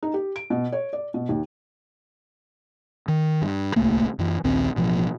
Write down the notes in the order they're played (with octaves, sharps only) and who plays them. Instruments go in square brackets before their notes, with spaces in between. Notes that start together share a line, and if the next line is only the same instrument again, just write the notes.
[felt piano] D#4
G4
D7
B2
C#5
D5
B2
D#2
[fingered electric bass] D#3
G2
D1 C2 A3 A#3
F#2 E3
A#1 D#2 C4
A1 B2 F3